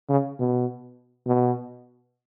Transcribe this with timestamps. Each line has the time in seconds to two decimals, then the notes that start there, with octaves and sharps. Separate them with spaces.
0.10 C#3
0.40 B2
1.26 B2